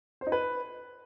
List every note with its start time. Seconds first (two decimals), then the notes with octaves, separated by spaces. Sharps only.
0.21 C5
0.27 D#4
0.32 B4